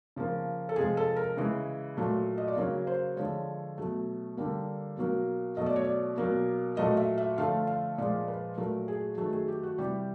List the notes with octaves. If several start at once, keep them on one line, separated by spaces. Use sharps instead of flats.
C#3 F3 A#3
A4
C3 F3 G#3 G#4
A4
A#4
C#3 E3 G#3
A#2 F#3 A3
D#5
D5
C#3 F#3 A#3 C#5
C5
D3 F3 G#3 C#5
B2 F#3 A3
D3 G3 A#3
B2 F#3 A#3
B2 F#3 A3 D#5
D5
C#5
D5
B2 F#3 A#3
A#2 F#3 A3 D#5
E5
E5
D3 F3 A3 F5
F5
A#2 F3 G#3 D5
B4
A#2 F#3 A3 A#4
G#4
D#3 F#3 A3 G#4
G#4
G4
F#4
C3 E3 G3 G4